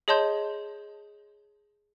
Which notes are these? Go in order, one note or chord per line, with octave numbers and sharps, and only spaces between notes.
G#4 C#5 D#5 A5 C6 G6